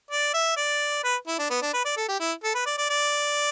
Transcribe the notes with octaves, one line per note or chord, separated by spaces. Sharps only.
D5
E5
D5
B4
E4
D4
B3
D4
B4
D5
A4
G4
E4
A4
B4
D5
D5
D5